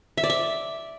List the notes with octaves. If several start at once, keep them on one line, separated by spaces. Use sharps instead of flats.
E5
D5
E5